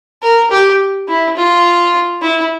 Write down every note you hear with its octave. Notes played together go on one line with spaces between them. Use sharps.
A#4
G4
E4
F4
E4